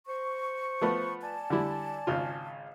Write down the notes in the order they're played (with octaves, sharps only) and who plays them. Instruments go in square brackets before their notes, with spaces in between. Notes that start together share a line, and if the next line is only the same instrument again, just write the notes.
[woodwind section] C5 C#6
[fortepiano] F3 A3 B3
[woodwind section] D5 G#5 A5
[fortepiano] D3 G3 E4
G#1 C#3 F4